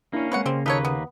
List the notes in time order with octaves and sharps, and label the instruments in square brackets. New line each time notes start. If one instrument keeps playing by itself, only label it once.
[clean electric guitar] A#3 C#4 [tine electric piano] D4 E4
[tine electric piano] G#3 C4 [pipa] B4 C#5 F#5
[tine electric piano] C#3 [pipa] G3 C4
[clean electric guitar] D#2 A#3 B4 [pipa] D#4 A4 C#5
[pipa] B3